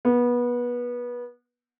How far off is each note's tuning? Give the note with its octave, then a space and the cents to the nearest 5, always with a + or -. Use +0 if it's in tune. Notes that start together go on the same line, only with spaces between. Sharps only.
B3 -25